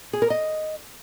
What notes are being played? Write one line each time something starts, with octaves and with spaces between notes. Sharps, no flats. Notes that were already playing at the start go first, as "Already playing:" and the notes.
G#4
A#4
D#5